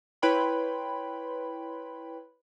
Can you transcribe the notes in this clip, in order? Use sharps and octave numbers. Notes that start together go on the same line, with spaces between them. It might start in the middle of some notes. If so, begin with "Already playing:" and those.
E4 B4 C#5 G5 B5 C6